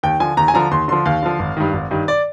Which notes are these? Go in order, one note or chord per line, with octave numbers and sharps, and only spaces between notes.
D#2 G5
D3 F3 G#5
D#2 A#5
G#5
D3 F3 A#5
D#2 C6
D3 F3 C6
D#2 F5
D3 F3
G#1
G2 D#3
G#1
G2 D#3
D5